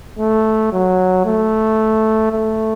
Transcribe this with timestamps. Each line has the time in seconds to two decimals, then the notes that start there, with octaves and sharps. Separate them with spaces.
0.18 A3
0.72 F#3
1.26 A3
2.32 A3